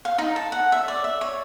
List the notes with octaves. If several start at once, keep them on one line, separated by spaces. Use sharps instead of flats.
F5
D#4
A5
F#5
E5
D5
E5
C#5